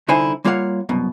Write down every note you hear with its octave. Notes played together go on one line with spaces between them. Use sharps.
C2 D3 D#4 E4 C5 G#5
G3 A#3 F4 C#5 F5 F#5
C2 F#2 B2